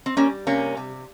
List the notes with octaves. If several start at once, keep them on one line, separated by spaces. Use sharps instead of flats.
C4
G3 A#3 C#4
C3 A#3 C#4
C3